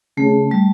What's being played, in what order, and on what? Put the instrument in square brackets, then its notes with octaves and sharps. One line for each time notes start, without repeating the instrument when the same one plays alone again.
[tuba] C#3 [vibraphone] A3
[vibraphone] G3